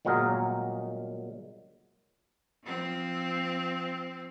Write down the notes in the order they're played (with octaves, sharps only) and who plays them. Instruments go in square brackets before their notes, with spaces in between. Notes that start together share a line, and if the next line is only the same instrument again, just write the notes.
[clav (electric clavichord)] G1 A#2 F#3 G#3 A#4 D#5
[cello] F3 C4